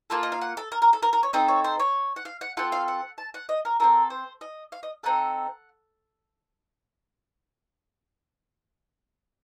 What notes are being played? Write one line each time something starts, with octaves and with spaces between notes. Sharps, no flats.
A#3 F4 A4 A5
D#5
F5
F#5
A4
A#4
A#4
A4
A#4
A#4
C#5
C4 D#4 A4 D#5
C#5
C5
C#5
F#5
F5
F#5
C4 F4 A4 F#5
F5
F#5
A5
F#5
D#5
A#4
C4 D#4 A4 A#4
C5
D#5
F5
D#5
C4 D#4 A4 F#5